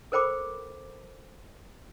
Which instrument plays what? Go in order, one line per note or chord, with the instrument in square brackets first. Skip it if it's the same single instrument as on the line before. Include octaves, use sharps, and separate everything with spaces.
[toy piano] A4 A#4 C5 G5 B5 D6